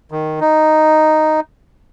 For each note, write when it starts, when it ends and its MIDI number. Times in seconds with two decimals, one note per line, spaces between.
0.11 0.40 51
0.41 1.40 63